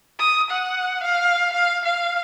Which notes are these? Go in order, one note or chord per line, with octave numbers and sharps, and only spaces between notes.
D#6
F#5
F5
F5
F5